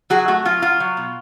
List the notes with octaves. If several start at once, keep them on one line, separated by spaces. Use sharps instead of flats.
F#3 F#4 G#4
A3 F#4
F#3 F4
F#3 F4
F#3
B2